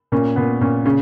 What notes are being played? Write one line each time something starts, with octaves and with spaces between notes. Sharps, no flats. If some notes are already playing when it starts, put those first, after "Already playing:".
A#2 C#4
A#2 B3
A#2 C#4
C#3 C#4